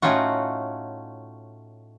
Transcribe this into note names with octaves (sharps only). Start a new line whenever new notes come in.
A2 A3 C#4 D#4 F4 F#4